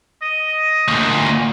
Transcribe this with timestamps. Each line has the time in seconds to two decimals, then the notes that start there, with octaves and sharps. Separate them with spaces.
0.23 D#5
0.88 D2 A#2